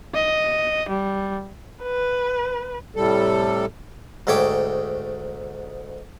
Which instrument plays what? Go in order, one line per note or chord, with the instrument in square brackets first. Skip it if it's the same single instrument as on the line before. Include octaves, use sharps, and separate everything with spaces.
[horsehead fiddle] D#5
G3
[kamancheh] B4
[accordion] A2 C3 G3 A4
[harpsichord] D2 G#2 A3 C#5 G5 D6